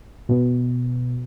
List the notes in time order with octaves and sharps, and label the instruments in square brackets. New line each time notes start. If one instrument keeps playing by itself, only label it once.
[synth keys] B2